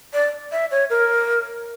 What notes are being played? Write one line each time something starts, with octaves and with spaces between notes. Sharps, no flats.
D5
E5
C#5
A#4